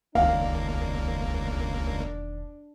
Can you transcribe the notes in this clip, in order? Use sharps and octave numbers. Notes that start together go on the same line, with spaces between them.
E1 C#2 D#3 A#3 D4 F5